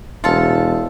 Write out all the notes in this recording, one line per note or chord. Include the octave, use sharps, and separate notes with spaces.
E1 F4 A4